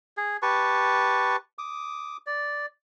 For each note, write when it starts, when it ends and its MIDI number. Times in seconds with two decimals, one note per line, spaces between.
0.17 0.37 68
0.42 1.36 67
0.42 1.36 71
0.42 1.36 81
0.42 1.36 85
1.58 2.17 86
1.58 2.17 87
2.26 2.66 74